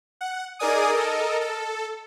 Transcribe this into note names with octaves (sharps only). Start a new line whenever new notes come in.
F#5
D#4 G#4 A#4 D5 G#5 D#6
A4 A#4 D#5
A4